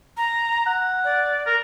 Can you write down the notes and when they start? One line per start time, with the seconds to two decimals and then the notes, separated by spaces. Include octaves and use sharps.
0.17 A#5
0.67 F#5
1.04 D5
1.47 A#4